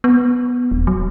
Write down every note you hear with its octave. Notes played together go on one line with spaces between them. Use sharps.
B3
D#1
F#3